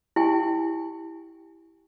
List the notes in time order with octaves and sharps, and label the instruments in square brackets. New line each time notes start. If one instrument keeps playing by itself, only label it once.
[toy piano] E4 G4 G5 G#5